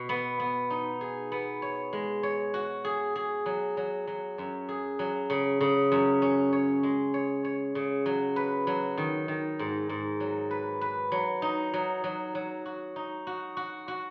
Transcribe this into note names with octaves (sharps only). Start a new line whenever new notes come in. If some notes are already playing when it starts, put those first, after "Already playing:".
Already playing: B2
B3
B3
D#4
G#4
B3
C#5
G#3
C#5
F#4
G#4
G#4
F#3
F#3
F#3
F#2
G#4
F#3
C#3
C#3
F#2
C#4
C#5
G#3
C#5
C#5
C#3
F#3
B4
F#3
D#3
D#3
G#2
G#2
F#3
B4
B4
F#3
D#4
F#3
F#3
F#3
F#4
D#4
F#4
F#4
F#4